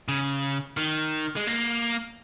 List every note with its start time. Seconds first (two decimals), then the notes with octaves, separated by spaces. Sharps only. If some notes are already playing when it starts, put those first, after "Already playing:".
0.08 C#3
0.77 D#3
1.36 G#3
1.47 A#3